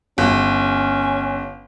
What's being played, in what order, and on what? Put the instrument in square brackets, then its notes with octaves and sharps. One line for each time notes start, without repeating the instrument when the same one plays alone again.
[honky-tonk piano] G1 [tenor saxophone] C#4